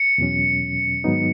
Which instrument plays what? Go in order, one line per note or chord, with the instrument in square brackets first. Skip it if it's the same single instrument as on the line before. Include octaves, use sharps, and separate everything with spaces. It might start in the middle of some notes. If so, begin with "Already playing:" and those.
Already playing: [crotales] C#7
[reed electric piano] E2 B2 F#3 C#4
G#2 D#3 F#3 B3 D#4